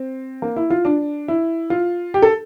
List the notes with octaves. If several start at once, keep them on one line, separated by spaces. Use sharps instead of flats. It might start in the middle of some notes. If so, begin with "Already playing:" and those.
Already playing: C4
A#3
E4
F4
D4
E4
F4
G4
A4